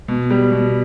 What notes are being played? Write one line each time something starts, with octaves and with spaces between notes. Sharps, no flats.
B2
G3
B2